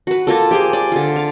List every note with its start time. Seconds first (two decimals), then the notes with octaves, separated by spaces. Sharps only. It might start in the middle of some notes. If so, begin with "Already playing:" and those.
0.07 F#4 B4
0.27 A#3 F4 A4
0.51 G4 G#4 C5
0.73 D5 G#5
0.92 D3 F4
1.16 F5